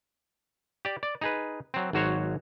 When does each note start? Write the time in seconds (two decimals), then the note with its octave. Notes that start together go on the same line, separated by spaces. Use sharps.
0.85 G4 D5
1.03 D5
1.21 D#4 G#4 B4
1.74 F#3 C4
1.93 G#1 F#3 F#4 C5 C#5